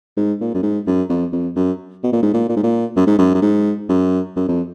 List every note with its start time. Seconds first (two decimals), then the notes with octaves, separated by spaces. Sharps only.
0.17 G#2
0.40 A#2
0.54 F#2
0.63 G#2
0.87 F#2
1.09 F2
1.32 F2
1.56 F#2
2.03 B2
2.12 A#2
2.23 G#2
2.33 A#2
2.49 A#2
2.56 G#2
2.63 A#2
2.96 F#2
3.07 G#2
3.18 F#2
3.35 F#2
3.42 G#2
3.89 F#2
4.36 F#2
4.48 F2